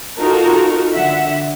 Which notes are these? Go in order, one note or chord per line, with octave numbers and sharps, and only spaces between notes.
D#4 F4 F#4 A4 A#4
D3 E5 F#5